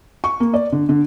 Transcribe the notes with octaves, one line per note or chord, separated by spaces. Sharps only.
C#6
A#3
D5
D3
D3